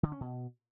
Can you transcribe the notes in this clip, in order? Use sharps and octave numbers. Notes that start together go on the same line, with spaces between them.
D3
C#4
B2